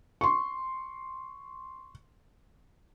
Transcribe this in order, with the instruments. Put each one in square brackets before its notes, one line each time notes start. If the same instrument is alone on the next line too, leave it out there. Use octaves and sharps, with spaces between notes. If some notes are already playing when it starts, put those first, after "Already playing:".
[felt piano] C6 C#6